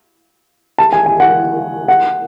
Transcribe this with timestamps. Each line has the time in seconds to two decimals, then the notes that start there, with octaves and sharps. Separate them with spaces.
0.78 A5
0.93 G#5
1.06 G#5
1.20 F#5
1.88 F#5